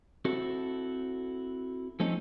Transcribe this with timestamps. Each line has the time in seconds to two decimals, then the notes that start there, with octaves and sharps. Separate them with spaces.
0.25 C4 E4 F#4 A4
2.00 F3 A3 C4 C#4 D#4 A4